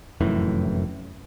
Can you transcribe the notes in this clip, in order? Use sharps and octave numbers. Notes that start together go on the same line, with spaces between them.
F1 F#2 A2 E3